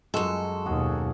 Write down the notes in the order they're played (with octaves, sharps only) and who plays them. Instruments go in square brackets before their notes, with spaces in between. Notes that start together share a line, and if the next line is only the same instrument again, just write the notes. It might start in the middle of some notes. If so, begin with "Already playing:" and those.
[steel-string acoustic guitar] F#2 A4 [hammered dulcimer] G#3 F#4
[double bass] D#2 B2 [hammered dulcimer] F#4 G#4